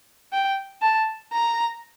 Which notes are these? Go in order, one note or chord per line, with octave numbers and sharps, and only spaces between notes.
G5
A5
A#5